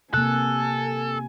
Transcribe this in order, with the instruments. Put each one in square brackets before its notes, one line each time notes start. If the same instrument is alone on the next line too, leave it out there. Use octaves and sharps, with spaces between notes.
[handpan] C3 A#3 [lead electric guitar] A4 [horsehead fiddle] G#5 [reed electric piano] F#6